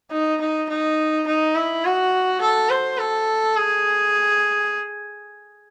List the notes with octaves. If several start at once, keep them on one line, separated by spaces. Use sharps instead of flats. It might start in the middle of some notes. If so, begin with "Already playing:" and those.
D#4
D#4
D#4
D#4
E4
F#4
A4
C5
A4
G#4